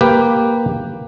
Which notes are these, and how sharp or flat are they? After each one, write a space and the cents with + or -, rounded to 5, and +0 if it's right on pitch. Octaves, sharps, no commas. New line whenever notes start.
A#3 +5 G4 +0 B4 +0